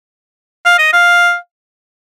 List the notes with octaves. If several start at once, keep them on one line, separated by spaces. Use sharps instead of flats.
F5
D#5
F5